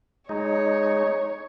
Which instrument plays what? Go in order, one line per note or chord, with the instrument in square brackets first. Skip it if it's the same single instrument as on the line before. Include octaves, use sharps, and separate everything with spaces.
[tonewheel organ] G#3 D#4 [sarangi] C#5